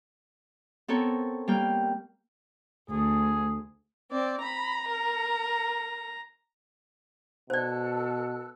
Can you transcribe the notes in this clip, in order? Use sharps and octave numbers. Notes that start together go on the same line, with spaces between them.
B3 C4 A4 A#4 C#5
G3 A#3 G5 F6
D2 G#4
C4 D5
A#5 B5
A#4
B2 A4 C5 D5 E6 F#6